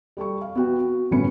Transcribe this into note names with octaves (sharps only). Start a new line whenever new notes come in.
G3 G4 A4 C#6
F5
B3 F#4 G5
F#4
G1 A2 B3 C#4 B5 C#7